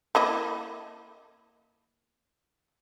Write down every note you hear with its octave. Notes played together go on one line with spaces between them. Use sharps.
A#3 E4 D#5